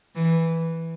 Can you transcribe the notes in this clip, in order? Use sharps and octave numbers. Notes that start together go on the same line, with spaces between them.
E3